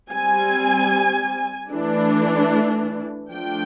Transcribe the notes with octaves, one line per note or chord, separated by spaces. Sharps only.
G3 C4 G#5
E3 A3 D4
F3 A3 D4 G5